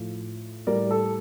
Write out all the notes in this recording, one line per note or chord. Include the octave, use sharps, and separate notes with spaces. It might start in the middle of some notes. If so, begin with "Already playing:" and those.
Already playing: A2 F3
A2 G3 A#4 D5
A4